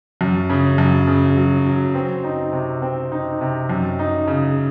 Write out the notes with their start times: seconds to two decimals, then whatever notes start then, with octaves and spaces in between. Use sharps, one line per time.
0.21 F#2
0.50 C#3
0.78 F#2
1.07 C#3
1.37 F#3
1.66 F#3
1.95 C4
2.24 D#4
2.53 C3
2.82 C4
3.12 D#4
3.41 C3
3.69 F#2
3.99 D#4
4.27 C#3